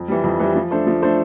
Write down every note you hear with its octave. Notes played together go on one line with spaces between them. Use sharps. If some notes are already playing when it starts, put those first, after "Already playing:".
Already playing: F2
E3 G3
F2
E3 G3
F3
A3 D4 A4 C5
F3
A3 D4 A4 C5